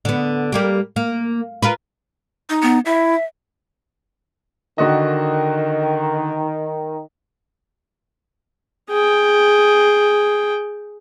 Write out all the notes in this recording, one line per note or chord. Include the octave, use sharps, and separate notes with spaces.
D3 B3
G3 A#3 G4
A#3
F4 A#4 B4
D#4
B3
E4 E5
D3 D#3 F#4 D#5
G#4 G5